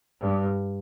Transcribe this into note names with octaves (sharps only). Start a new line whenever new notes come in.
G2